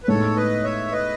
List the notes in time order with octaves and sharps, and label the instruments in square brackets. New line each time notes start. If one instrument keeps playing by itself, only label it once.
[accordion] B4
[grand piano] A2 G#3 B3 D#4 [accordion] A4 C#5
[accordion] B4 D#5
C#5 E5
B4 D#5